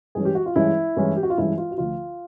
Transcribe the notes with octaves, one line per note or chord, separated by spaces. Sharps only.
G2 E3 G#3 C#4 G#4
G4
F#4
F4
G2 E3 G#3 C#4 E4
G2 E3 G#3 C#4
G4
F#4
F4
G2 E3 G#3 C#4 E4
F4
F#4
D2 D3 F3 F4